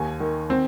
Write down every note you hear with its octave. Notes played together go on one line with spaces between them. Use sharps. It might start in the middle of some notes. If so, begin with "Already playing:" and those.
Already playing: D#2 G#5
D#3
C4